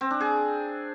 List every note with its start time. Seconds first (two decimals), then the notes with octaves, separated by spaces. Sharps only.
0.01 C4
0.11 D4
0.20 G#4